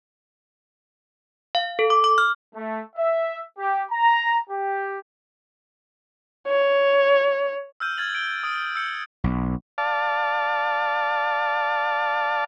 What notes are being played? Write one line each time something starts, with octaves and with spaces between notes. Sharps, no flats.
F5
A4
D6
D6
F6
A3
E5
G4
A#5
G4
C#5
E6 F6 G6 D#7
F6 G#6 A6 F#7
D7 G7
D#6 D7
E6 G6 C#7
B1
D5 F5 A5